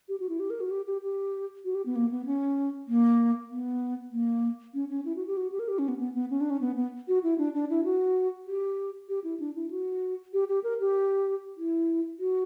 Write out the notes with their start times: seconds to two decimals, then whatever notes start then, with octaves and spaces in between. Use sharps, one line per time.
0.09 G4
0.20 F#4
0.29 E4
0.40 G4
0.50 A#4
0.60 F#4
0.71 G4
0.87 G4
1.02 G4
1.65 F#4
1.75 G4
1.86 B3
1.96 A#3
2.11 B3
2.26 C#4
2.88 A#3
3.50 B3
4.12 A#3
4.74 C#4
4.90 C#4
5.05 E4
5.16 F#4
5.27 G4
5.37 F#4
5.52 G4
5.59 A#4
5.68 G4
5.79 C#4
5.88 B3
5.99 B3
6.15 B3
6.30 C#4
6.41 D4
6.50 C#4
6.61 B3
6.76 B3
7.08 F#4
7.23 E4
7.38 D4
7.54 D4
7.70 E4
7.84 F#4
8.47 G4
9.09 G4
9.24 E4
9.40 D4
9.56 E4
9.70 F#4
10.33 G4
10.49 G4
10.64 A#4
10.80 G4
11.57 E4
12.19 F#4